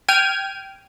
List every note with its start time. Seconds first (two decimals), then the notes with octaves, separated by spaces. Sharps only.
0.08 G5 F6 G#6 D#7